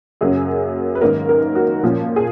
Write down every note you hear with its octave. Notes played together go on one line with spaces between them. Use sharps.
F#2 C#3 F#3 A#3 C#4 G#4
B4
G#2 D#3 A#3 C#4 A#4
A#4
F#4
A#2 F3 A#3 C#4
G#4